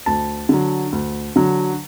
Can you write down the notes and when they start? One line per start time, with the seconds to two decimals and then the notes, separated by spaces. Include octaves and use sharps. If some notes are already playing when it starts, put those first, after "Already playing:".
0.06 D2 A5
0.49 D3 F#3
0.92 D2
1.36 D3 F#3